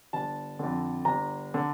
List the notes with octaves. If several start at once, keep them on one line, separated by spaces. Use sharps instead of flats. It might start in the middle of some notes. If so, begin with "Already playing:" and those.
G1 A5
F2 D3
G1 A#5
D3